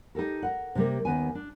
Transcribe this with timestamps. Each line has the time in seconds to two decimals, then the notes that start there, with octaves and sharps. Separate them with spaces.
0.15 D#4 G4 A4 A#4
0.42 A#4 F#5
0.75 C3 G3 A#3
1.05 D#2 D#3 B3 G#5
1.35 D4